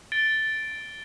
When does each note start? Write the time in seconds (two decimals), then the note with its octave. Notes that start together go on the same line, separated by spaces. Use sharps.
0.12 A6 D7 G7